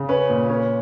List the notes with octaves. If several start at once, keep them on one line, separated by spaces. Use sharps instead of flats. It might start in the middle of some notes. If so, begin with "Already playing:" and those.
Already playing: C#3
C#4 B4
A#2
C#4